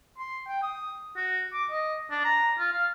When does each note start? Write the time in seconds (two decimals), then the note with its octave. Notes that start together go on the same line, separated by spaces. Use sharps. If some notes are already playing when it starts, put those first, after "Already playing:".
0.18 C6
0.48 G5
0.63 D#6
1.16 F#4
1.53 D6
1.71 D#5
2.11 D4
2.24 A#5
2.59 F4
2.73 F5